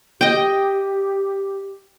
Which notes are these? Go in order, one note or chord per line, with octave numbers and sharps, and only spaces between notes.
G4 D#5 G5